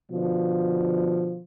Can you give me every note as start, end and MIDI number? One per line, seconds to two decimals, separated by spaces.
0.11 1.40 47
0.11 1.40 50
0.11 1.40 53